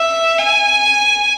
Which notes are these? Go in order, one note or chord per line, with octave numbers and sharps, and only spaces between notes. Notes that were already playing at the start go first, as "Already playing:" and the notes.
Already playing: E5
G#5